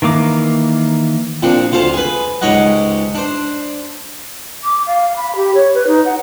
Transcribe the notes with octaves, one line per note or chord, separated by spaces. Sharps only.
D#3 E3 A#3 D6
A#2 F3 C4 D4
D2 F4 C5 F5 A5
G#4 B4
C#2 G#2 G4 C#5 D#5 F#5
D4 C5
D6
F5
B5
G4
C#5
B4
D#4
F#5